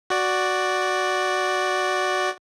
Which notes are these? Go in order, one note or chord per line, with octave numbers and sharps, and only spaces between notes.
F#4 D5